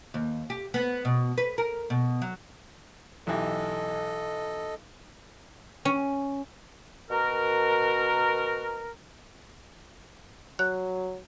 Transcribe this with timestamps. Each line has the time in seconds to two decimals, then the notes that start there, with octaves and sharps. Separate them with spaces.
0.14 D#2
0.50 G4
0.74 B3
1.05 B2
1.38 B4
1.58 A#4
1.90 B2
2.22 F#3
3.27 B1 E3 G4 A4 D#5
5.85 C#4
7.11 B2 F#4 A#4
10.59 F#3 F#6